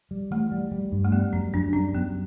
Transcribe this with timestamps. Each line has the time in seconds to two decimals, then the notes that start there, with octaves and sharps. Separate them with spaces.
0.11 G3
0.31 E3 A3
0.52 G3
0.72 G3
0.92 G2
1.05 A3
1.12 G3 B3
1.33 F#2 C#4
1.54 F#2 D4
1.73 G3 C#4
1.94 F#2 B3